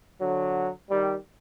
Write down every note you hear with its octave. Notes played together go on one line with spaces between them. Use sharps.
D3 F#3
D#3 G3